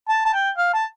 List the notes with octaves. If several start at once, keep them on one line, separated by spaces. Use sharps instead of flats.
A5
A5
G5
F5
A5